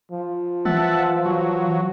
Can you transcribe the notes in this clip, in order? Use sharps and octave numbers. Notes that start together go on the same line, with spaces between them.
F3
E3 E5 F#5 A5
F#3